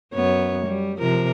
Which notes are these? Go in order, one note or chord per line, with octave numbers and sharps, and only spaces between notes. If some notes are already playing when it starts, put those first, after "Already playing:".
F#2 B3 C#5
G3
C3 F3 A#4